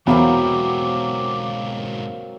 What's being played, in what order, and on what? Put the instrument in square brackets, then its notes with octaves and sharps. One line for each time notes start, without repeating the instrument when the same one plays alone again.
[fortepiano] E2 B5 [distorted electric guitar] G#2 B2 [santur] F#3 A#3 C4 [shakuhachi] D6